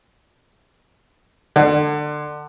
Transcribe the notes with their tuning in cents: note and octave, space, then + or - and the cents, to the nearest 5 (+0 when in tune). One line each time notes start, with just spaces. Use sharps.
D3 +25